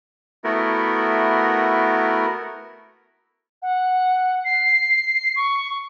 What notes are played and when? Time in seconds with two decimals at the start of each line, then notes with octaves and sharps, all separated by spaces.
0.44 A3 B3 E4 F#4 A#4
3.62 F#5
4.44 C7
5.36 C#6